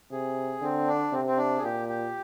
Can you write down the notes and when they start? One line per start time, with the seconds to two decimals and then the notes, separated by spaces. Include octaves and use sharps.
0.11 C3 G#4
0.62 D3 C4
0.88 D4
1.13 C3 C4
1.27 C4
1.37 D4
1.58 G#4
1.62 A#2 G4
1.88 G4